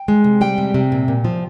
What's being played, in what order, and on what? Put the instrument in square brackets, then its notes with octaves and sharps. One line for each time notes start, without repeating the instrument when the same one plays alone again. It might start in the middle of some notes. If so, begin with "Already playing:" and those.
Already playing: [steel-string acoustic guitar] G5
G#3
C3
G3 G5
C3
C3
A#2
A#2
F3